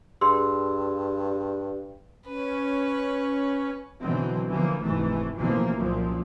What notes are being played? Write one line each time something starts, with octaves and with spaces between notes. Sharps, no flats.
G2 G#4 C6 E6
C#4 B4
B2 D3 E3 F#3 C4
D3 E3 F3 A#3
F1 G#2 C3 E3 A3
A1 D2 B2 E3 F3 A#3
C2 F#2 A#2 F3